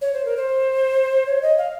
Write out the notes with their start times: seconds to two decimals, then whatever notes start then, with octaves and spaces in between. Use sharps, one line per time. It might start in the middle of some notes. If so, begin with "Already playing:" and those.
0.01 C#5
0.13 C5
0.25 A#4
0.36 C5
1.26 C#5
1.42 D#5
1.58 F5